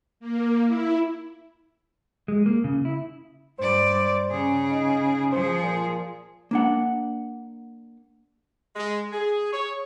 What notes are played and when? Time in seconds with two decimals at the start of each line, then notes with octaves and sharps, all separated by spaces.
0.20 A#3
0.66 E4
2.28 G#3
2.46 A#3
2.64 C#3
2.85 E4
3.59 G2 C5 D5
4.31 C#3 G#4
4.71 D#4
5.32 F3 G#4 C5
5.63 A#2
6.51 A#3 D4 F#5
8.76 G#3
9.12 G#4
9.52 C#5